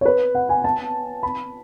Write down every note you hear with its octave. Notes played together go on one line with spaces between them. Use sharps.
C#5
B4
F#5
G#5
A5
B5